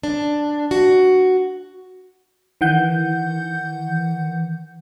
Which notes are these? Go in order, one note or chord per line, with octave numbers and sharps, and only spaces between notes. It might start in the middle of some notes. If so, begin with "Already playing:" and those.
D4
F#4
D#3 E3 F#5 G6